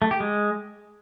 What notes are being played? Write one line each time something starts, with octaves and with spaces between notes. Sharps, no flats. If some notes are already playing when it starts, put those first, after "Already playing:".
A3
G4
G#3